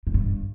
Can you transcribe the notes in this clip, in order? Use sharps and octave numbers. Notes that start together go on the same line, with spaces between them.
A2
G2